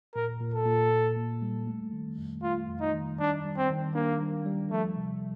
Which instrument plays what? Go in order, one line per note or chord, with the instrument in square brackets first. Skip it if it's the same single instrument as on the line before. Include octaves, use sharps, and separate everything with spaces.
[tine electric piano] A#2 [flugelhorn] A#4
[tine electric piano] A#2
[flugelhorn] A4
[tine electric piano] A#2
A#2
A#3
G3
A3
D#3
F2
[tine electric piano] A3 [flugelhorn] F4
[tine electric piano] F2
[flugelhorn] D#4
[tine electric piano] D#3
[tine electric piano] G3 [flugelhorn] D4
[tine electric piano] G3
[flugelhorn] C4
[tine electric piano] D#3
[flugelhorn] A#3 [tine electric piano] D4
[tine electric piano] G3
G3
[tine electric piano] F3 [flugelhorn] A3
[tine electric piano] C3